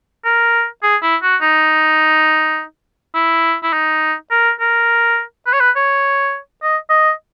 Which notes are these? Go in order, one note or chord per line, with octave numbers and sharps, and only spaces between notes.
A#4
G#4
E4
F#4
D#4
E4
E4
D#4
A#4
A#4
B4
C#5
B4
C#5
D#5
D#5